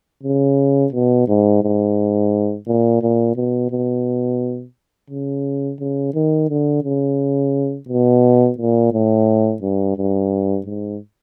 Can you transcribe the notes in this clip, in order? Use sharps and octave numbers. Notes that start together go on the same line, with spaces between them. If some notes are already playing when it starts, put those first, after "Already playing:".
C#3
B2
G#2
G#2
A#2
A#2
B2
B2
C#3
C#3
D#3
D3
C#3
B2
A#2
A2
G2
G2
G#2